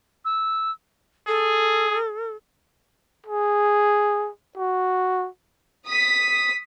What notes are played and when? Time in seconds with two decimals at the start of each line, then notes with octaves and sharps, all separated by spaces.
0.25 E6
1.27 G#4 A4
3.27 G#4
4.57 F#4
5.88 D#6 B6